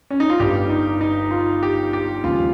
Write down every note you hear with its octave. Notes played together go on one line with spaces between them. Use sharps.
C#4
D#4
F4
G1 G2 G3 G4
D#4
D#4
F4
G4
G4
D#2 C#3 F3 G#3 F4